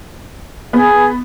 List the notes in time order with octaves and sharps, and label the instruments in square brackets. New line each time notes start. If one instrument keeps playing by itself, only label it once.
[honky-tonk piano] B3 [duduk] G#4